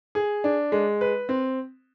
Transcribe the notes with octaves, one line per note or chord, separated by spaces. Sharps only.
G#4
D4
G#3
B4
C4